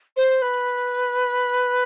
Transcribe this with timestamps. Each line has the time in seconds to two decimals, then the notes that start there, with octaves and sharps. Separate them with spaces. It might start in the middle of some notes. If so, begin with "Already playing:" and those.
0.17 C5
0.42 B4